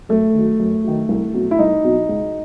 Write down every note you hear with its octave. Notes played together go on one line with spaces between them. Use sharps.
F#2 A3
D#3 F#3
F#2
D#3 F#3
C2
B2 F#3
E4
C2 D#4
B2 F#3
C#2